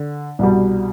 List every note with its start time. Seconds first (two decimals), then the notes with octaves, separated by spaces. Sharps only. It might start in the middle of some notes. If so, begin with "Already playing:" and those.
Already playing: D3
0.39 C2 B2 G3